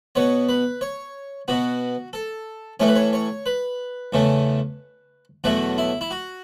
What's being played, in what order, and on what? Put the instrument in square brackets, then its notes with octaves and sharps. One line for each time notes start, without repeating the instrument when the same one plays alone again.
[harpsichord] B2 B3 C#5
B4
C#5
B2 B3 F#4
A4
A2 E3 A3 C#4 C#5
B4
C#5
C#5
B4
E2 C#3 A3 C#4
E2 B2 F#3 A3 F#4
E4
E4
F#4